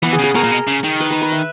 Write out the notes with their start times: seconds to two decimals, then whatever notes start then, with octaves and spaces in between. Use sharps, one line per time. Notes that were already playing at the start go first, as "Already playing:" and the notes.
0.03 E3 B3
0.13 G#4
0.18 C#3
0.23 G#4
0.35 B2 A#4
0.43 A#2
0.51 B2
0.67 C#3
0.84 D#3
1.00 B4
1.11 B4
1.22 B4
1.32 E5